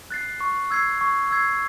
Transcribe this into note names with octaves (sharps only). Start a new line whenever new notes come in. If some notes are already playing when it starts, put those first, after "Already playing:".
F#6 A6 C7
C#6
E6 G#6 C7
C#6
E6 G#6 C7